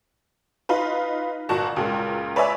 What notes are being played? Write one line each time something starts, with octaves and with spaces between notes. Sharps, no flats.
D#4 F4 B4
G1 A#2 F#4 A5
C#2 A#2
B4 C#5 D5 E5 G#5